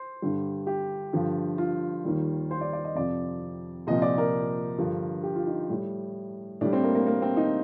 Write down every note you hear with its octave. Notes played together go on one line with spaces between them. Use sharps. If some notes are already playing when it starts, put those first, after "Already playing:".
Already playing: C5
G2 D3 G3
G4
G2 D3 F3
F4
D#2 D#3 G3
C5
D5
D5
D#5
F2 C3 F3 D5
C2 A#2 F3 D#5
D5
A#4
G2 D3 F3
G4
F4
D#4
A2 G3
A2 G3 D4
C4
A#3
A#3
A#3
C4
D#4